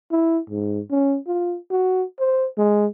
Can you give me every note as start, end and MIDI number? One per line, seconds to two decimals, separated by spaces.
0.12 0.39 64
0.50 0.80 44
0.91 1.17 61
1.27 1.57 65
1.71 2.04 66
2.20 2.47 72
2.58 2.86 56